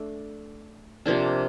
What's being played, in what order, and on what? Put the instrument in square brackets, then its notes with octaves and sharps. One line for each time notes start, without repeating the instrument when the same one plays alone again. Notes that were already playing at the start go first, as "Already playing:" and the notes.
Already playing: [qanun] A3 D4
C3 F3 A#3 D4